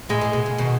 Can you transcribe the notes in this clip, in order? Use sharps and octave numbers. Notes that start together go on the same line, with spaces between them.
A2 G#3
A2
B2
C#3
B2 D#3